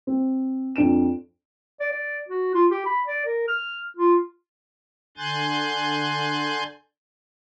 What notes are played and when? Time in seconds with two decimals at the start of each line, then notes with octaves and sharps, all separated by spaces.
0.07 C4
0.76 F2 D4 D7 E7
1.80 D5
1.92 D5
2.29 F#4
2.55 F4
2.71 G4
2.86 B5
3.06 D5
3.26 A#4
3.48 F6
3.97 F4
5.17 D3 G#5 C6 F#6 G6 A6